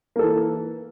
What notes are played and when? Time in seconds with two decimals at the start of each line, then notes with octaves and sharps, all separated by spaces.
0.16 A#3
0.19 A4
0.23 E3